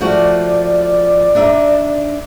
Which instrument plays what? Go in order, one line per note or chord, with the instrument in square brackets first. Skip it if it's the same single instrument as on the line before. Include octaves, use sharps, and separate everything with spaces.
[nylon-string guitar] F3 A3 F#4 [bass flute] D5
[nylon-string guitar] D4 D#4 E5